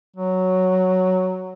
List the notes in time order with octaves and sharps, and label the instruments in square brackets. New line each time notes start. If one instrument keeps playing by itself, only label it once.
[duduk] F#3